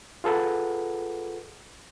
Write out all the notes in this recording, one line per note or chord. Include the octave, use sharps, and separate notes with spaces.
F4 G#4 A4 B4 F#5